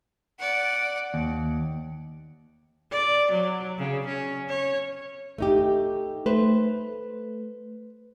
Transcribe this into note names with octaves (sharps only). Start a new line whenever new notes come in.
D5 F#5
D#2
D5
F#3
C#3
C#4
C#5
A3 D#4 G4
A3 B4 C5